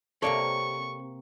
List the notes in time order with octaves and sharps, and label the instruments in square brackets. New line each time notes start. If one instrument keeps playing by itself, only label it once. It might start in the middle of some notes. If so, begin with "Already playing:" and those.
[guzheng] C3 A#3 C4 [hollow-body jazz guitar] A4 C#5 D5 [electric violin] C#6